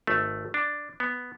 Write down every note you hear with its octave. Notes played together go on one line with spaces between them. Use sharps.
G#1 A3
D4
B3